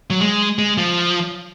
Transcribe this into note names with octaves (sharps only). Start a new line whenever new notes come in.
F#3
G#3
G#3
F3